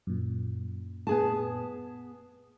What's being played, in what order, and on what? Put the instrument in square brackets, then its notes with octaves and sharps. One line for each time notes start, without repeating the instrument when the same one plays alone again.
[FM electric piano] F#2 A#2
[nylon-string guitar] B3 G#4 A5